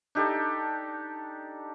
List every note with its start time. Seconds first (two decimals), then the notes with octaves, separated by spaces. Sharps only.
0.15 D4 D#4 G4 A4